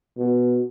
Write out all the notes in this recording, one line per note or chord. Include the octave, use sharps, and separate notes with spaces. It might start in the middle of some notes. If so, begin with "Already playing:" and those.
B2